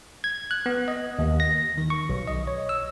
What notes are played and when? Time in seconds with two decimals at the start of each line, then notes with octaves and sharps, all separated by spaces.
0.24 G#6
0.51 F#6
0.66 B3
0.88 D#5
1.19 D#2
1.40 A#6
1.78 D#3
1.90 C#6
2.09 B1
2.27 D#5
2.47 C#5
2.69 E6